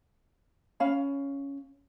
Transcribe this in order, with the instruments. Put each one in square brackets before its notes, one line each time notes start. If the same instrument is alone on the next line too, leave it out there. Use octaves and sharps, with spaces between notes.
[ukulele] C#4 F5 B5